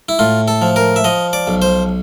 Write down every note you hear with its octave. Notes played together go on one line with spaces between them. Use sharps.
E4
A2 F4
A4
F3
A#4
E5
F3 D#5
D5
B1
C5